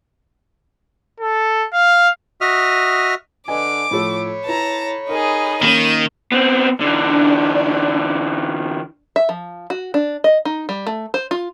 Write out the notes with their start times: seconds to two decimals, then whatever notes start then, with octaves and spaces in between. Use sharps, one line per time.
1.20 A4
1.73 F5
2.41 F#4 D#5 E5 D#6 F6
3.48 D3 B4 D#5 G#5 D6
3.91 A2 F3 A4 C#5 B5
4.45 E4 B4 A5 A#5
5.10 D#4 G#4 A#4
5.63 D#3 A#3 C#4 D#7 E7
6.32 B3 C4
6.80 D3 E3 D4
9.16 E5
9.29 F3
9.70 F#4
9.94 D4
10.24 D#5
10.45 D#4
10.69 G3
10.87 A3
11.14 C5
11.31 F4